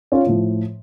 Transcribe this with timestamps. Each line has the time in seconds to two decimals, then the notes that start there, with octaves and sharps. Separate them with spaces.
0.12 C#4 F4
0.27 A2 F3